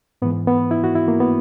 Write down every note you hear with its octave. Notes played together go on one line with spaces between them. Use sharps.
G#2 E3 B3
B3
E4
F#4
E4
A#3
B3